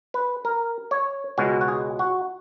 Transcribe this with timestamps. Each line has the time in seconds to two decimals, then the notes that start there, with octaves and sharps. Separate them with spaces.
0.14 B4
0.45 A#4
0.91 C#5
1.38 C#2 B2 G#3 C#4 F#4
1.61 F#4
1.68 G#4
1.99 F#4